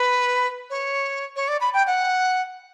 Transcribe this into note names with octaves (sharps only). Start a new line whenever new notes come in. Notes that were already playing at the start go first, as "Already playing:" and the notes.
Already playing: B4
C#5
C#5
D5
B5
G5
F#5